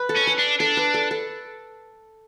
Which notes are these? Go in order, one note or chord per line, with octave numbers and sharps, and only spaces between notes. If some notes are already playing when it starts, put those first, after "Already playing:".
Already playing: B4
A4
C#4
B4
D4
D4 A4
B4
A4
A4